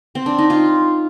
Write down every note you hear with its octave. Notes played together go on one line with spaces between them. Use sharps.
C4
D4
D#4
F4